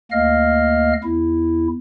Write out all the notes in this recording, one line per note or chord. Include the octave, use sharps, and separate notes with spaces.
D2 A#3 D#5 F5 F6
E2 E4